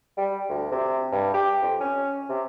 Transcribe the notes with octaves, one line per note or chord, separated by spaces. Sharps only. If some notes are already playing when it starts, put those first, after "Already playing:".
G3
D2
C3
G2
G4
F2
C#4
C3